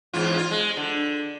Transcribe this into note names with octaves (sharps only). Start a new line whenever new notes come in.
E2 G#2 F4
F4
G#3
D3